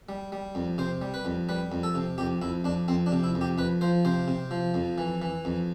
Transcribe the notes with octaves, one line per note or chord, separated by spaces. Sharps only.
G3
G3
F2
C3 C5
G3
B4
F2
G3 B4
F2
A4
C3
F2 G4
F2 E4
F2 D4
F2 C4
D4
C3
E4
F2
G4
F2 B4
F3 C5
C3 C5
C3
F3
F2
E3
E3
F2